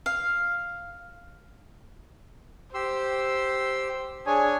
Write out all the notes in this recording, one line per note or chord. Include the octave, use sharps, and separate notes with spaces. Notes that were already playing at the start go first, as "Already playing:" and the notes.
F5
G4 C5 C6 E6
D4 G#4 C#5 G#5